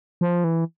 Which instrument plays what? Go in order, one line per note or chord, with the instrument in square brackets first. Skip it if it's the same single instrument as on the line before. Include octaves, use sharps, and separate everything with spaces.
[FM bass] F3
E3